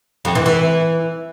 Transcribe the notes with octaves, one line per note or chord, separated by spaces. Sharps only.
F2
E3
E3